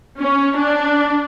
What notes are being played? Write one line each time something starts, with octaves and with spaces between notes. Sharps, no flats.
C#4
D4